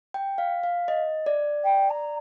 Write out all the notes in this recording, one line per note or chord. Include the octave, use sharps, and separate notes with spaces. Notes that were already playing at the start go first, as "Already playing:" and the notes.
G5
F5
F5
D#5
D5
G5
A#5